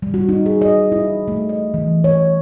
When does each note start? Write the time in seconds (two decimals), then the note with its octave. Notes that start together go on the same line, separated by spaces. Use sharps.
0.02 G3
0.14 F#4
0.29 D#4
0.46 G#4
0.62 D#5
0.92 E4
1.28 A3
1.49 D#5
1.74 E3
2.04 C#5